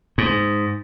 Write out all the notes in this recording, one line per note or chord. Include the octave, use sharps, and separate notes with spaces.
G#2